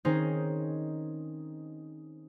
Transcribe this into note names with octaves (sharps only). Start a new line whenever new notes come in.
D#3 C4 C#4 D#4 G#4 C5